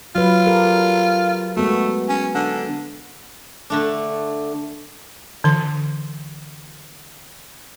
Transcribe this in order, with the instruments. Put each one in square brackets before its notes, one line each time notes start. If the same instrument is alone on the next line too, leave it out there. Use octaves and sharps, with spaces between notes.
[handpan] F#3 B4 [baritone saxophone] F4
[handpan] G4 A4 A#4
[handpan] G#3 B3 F#4 [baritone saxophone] A3
[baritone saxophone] C#4
D3
[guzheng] D3 A3 D4
[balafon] D3 E3 C6